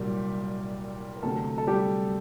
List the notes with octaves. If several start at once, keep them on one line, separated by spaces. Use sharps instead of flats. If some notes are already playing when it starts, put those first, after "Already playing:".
Already playing: C2 A#2 F#3 G3 G4
A#4
D2 C3 F#3 A3 A4
A4
G3 G4